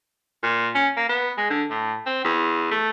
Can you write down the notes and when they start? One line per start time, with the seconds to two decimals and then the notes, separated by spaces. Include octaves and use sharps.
0.43 A#2
0.75 C#4
0.97 A#3
1.09 B3
1.38 G#3
1.50 D3
1.71 A2
2.06 C4
2.24 E2
2.71 A3